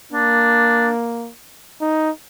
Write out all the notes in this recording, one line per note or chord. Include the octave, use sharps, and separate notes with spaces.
A#3 D4
D#4